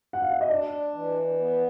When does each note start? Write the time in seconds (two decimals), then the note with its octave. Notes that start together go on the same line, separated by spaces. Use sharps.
0.13 F#5
0.22 F5
0.31 E5
0.41 D#5
0.50 D4 D5
0.95 E3
1.39 B3